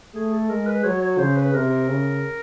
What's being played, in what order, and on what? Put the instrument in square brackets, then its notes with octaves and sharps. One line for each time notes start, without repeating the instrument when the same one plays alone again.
[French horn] A3 [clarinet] G#4
[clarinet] A4
[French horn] G#3 [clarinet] A#4
[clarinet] B4
[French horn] F#3 [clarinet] C#5
[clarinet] C#5
[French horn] C#3 [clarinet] C5
[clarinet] B4
[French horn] C3 [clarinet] A#4
[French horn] C#3